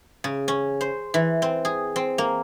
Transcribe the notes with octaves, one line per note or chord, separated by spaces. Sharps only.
C#3
C#4
C5
E3
C4
G#4
C4
A#3